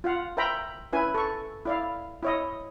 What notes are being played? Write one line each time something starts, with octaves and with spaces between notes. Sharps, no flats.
F4 F5 F#5
A#4 C5 E5 G5 A#5 B5
C#4 E4 B4 G#5
A4 C#6
E4 D5 F5
E4 C#5 D#5